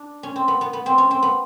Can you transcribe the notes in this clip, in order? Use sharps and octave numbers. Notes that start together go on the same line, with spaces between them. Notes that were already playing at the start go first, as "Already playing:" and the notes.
Already playing: D4
C#4
C4
B3
B3
B3
C4
C#4
C4
B3